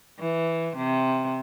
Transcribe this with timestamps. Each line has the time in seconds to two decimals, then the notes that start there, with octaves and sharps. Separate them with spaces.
0.19 E3
0.77 C3